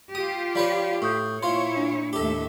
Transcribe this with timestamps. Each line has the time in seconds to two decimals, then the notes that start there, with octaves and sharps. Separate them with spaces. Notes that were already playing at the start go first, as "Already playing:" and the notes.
0.15 F4 G4 D#6
0.55 F3 B4 C#5 D5 F5
1.02 A2 C#6 D#6 G6
1.43 A#2 E4 F4 C5 C#5 C6
1.76 D4
2.13 D#2 A2 G4 A4 E5